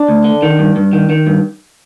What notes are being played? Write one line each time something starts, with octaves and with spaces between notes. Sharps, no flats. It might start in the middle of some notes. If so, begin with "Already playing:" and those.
Already playing: D4
D2
D3
D#3
G2
G2
D#3
D#3
G2